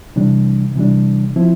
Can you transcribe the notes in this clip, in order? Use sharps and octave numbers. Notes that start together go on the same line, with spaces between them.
C3 E3 G3 D4
C3 E3 G3 D4
F3 C4 E4